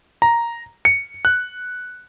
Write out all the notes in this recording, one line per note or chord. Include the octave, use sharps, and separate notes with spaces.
A#5
C#7
F#6